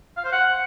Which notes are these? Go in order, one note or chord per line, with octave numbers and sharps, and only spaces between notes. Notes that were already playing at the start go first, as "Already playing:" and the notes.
F5
C5
F#5